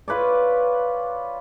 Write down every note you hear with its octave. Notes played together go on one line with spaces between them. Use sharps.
F4 B4 C#5 D5